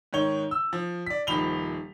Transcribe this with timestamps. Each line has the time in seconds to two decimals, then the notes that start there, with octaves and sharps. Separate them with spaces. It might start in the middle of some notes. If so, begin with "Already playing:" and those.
0.13 G#2 D#3 C#5 G7
0.51 E6
0.73 F3
1.06 D5 B6
1.27 D#1 D#3 F3 B5 F7 G7